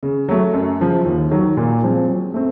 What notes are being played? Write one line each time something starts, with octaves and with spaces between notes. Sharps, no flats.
C#3
F#3 A3
F#2
C#3 F3
D#2
D#3 F#3
A#2
F3 G#3 C4
F#3
A3 C4